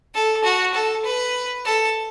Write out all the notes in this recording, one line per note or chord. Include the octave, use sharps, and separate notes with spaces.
A4
F#4
A4
B4
A4